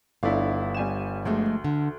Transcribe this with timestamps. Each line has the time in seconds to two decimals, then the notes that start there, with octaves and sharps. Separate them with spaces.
0.23 G1 A3 D4 E4 F5
0.74 G3 G#5 E7
1.25 D2 F3 G#3 A3
1.64 D3